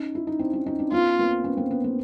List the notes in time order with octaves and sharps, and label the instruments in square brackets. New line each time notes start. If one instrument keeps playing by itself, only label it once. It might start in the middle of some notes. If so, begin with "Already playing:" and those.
Already playing: [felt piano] C#4 D#4
E4
D#4
C4 D4
C#4 D#4
C#4 D#4
C4 D4
[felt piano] B3 C#4 [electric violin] F4
[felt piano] A#3 C4
B3 C#4
A#3 C4
B3 C#4
A#3 C4